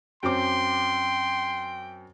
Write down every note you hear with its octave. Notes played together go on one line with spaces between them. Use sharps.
F#2 C4 G5 C6 D6